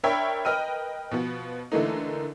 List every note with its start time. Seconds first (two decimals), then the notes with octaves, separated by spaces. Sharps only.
0.04 D4 A#4 C#5 E5 G5 B5
0.45 A#4 B4 D#5 G5 F6 D#7
1.11 B2 F3 B3
1.72 D3 E3 A3 A#3 D#4